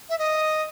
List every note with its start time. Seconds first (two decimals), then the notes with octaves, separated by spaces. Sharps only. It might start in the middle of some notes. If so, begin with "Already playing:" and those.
0.10 E5
0.19 D#5